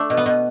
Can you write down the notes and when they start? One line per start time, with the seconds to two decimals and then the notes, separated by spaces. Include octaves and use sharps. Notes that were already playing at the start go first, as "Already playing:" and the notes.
Already playing: A3 D4
0.10 B2
0.17 B3
0.26 B2